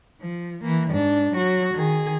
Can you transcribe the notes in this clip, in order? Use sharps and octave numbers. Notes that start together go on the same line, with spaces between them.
F3
E3 A#3
G#2 D4
F#3 F#4
D#3 G#4